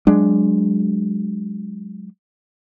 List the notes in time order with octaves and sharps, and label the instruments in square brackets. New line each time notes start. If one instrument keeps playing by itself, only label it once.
[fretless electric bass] F#3 G#3 D4